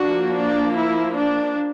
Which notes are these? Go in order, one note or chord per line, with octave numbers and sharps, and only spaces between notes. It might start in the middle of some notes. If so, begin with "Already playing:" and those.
Already playing: F3 A#3 D4 F#4
D4
E4
D4